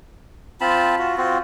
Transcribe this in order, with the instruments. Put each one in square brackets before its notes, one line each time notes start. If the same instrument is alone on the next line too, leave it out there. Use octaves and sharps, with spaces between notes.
[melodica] C4 F4 A5 B5
F4 F#4
C4 F4 F#4